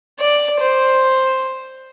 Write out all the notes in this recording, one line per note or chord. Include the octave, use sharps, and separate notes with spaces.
D5
C5